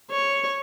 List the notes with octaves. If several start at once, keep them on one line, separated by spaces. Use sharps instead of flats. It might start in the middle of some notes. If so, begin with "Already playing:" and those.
C#5